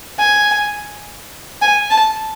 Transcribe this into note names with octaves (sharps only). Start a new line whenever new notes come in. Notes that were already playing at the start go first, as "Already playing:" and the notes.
G#5
G#5
A5